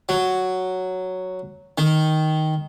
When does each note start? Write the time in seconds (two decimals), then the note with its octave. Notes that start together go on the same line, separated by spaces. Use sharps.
0.09 F#3
1.78 D#3